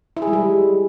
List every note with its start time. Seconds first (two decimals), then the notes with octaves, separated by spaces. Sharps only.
0.17 E4
0.22 G#4
0.27 G#3
0.33 G3